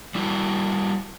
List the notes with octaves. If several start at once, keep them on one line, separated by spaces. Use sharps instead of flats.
G3 E4 F#4